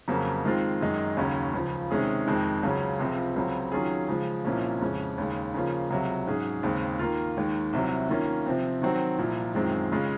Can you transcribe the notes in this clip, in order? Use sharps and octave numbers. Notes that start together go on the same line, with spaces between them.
F2 C#3 F#3 A#3 C#4
D#3 G#3 C4 F4
F#2 D#3 G#3 D#4
D#2 C#3 F#3 C#4
C#2 C#3 F3
C3 D#3 G#3 C#4 G#4
F2 D#3 G#3 C4
C#2 C#3 F#3 C#4
C#2 C3 F3 C4
C#2 C#3 F#3 C4
D#3 F#3 C#4 F4 G#4
C#3 F3 G#3
C2 A#2 F3 A#3 C#4
F2 C#3 G#3 C#4
D#2 C#3 G#3
C#3 F3 A#3 C#4 F4
C#2 C3 F#3
G#2 F#3 C#4 G#4
D#2 C#3 G#3 C4
D#3 A#3 F4
D#2 D#3 G#3
C2 C3 F#3
D#3 A#3 C#4 F4
C3 F3 C4
D#3 F#3 C4 F#4
C2 A#2 F3
F#2 D#3 G#3 C4 F4
C#3 G#3 C#4 F4